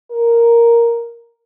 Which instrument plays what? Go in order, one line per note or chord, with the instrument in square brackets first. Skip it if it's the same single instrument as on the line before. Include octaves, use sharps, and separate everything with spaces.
[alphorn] A#4